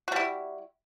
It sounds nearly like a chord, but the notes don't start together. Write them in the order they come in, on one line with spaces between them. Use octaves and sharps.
F#4 G3 E4